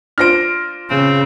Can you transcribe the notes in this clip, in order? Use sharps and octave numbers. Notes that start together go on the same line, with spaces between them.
D4 F4 C5 F6 A#6 D7
C#3 C4